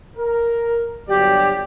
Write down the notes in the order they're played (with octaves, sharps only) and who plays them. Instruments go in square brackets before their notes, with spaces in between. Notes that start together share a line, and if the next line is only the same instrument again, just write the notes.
[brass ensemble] A#4
[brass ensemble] G1 F#3 D5 [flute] G4